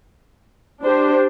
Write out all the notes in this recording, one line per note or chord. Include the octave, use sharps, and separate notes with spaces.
D4 G4 C5